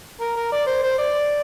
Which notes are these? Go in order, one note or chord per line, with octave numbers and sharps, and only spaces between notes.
A#4
A#4
D5
C5
C5
D5